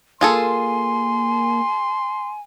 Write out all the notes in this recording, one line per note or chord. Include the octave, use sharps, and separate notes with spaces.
A#3 F4 G#4 A4 G#5 C6